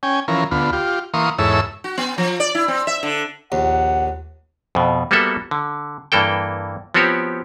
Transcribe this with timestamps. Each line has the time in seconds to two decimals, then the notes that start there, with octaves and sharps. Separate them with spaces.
0.03 C#4 G5 G#5
0.28 E3 F3 C#4 A#4
0.51 D2 B3 F4
0.73 F4 G4
1.14 E3 A#3 F5 C6 C#6 D#6
1.38 E2 G#2 A4 C#5 E5 E6
1.84 F#4
1.98 B3
2.18 F3
2.40 D5
2.55 E4
2.68 C4
2.87 E5
3.03 D3
3.52 A#1 D#2 F#5
4.75 F2 B2
5.11 G3 A#3 B3 F#4 A4 E5
5.51 D3
6.12 G2 E3 A#3 A4 G5
6.94 F3 B3 C4 F#4 G4 C#5